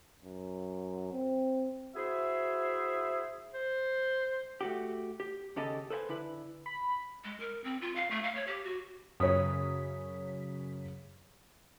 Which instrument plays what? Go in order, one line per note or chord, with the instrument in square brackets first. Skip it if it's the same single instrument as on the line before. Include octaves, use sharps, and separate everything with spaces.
[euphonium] F#2
C4
[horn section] E4 F#4 G#4 C5 E5
[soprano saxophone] C5
[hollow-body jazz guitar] A3 F#4 G4
G4
D#2 C#3 G4 A4 D#5
A4 B4 C5 E5 G#5
D3 E4 B4
[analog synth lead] B5
[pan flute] G#3
A#4
C4
F4
F5
A3
F5
C#5
G4
F#4
[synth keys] F#2 C#3 B6 [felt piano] C#5 D#6